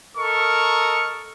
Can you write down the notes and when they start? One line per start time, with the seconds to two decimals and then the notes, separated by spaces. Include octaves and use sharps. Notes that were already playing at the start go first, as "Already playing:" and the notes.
0.17 A4 A#4 D#5 C#6